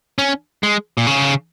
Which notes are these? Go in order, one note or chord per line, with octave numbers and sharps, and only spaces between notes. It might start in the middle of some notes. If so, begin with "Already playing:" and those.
C#4
G#3
A#2
C#3